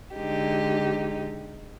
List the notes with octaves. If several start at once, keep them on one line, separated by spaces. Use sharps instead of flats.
D3 G#3 D#4 G4